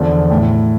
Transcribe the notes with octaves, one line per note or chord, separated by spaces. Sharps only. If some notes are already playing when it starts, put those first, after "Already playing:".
Already playing: E2 D3 F3
A2